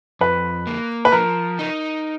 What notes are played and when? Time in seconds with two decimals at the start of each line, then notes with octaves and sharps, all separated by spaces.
0.21 F2 B4
0.67 A#3
1.05 B4
1.12 F3 A#4
1.59 D#4